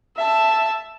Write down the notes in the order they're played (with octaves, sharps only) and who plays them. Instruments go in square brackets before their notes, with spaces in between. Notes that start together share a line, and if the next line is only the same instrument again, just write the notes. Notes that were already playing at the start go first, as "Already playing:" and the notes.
[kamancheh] E5 A5